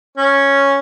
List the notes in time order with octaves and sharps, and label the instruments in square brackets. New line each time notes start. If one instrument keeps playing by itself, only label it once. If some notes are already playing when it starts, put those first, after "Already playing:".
[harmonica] C#4